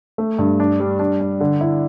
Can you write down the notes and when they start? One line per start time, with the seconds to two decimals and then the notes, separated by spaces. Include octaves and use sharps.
0.18 A3
0.38 G2
0.60 D4
0.80 G3
0.99 D4
1.21 D4
1.40 D3
1.61 E4